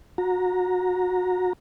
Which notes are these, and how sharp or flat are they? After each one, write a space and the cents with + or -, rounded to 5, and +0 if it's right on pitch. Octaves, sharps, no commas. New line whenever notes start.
F#4 -25 A#5 +0